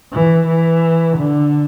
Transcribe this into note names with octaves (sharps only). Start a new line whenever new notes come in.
E3
E3
D3